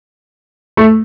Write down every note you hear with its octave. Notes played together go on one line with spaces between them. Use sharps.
A3